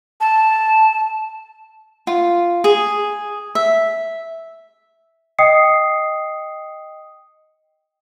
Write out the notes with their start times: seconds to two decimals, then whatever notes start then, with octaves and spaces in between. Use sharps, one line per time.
0.21 A5
2.07 F4
2.64 G#4
3.55 E5
5.39 D#5 G5 D#6 C7 C#7